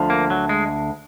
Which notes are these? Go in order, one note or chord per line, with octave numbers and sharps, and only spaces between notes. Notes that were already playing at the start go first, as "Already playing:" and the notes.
Already playing: D2 D3 F3
A#3
F#3
G#3